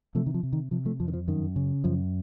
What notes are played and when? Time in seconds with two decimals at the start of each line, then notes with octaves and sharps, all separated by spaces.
0.15 C3 F3 A3
0.26 D#3
0.34 F3
0.43 C3
0.53 D#3
0.71 C3 F3
0.85 F3 A3
1.00 F2 F3
1.08 D#3
1.13 F3
1.28 F#2 D#3
1.56 C#3
1.84 F#2 F3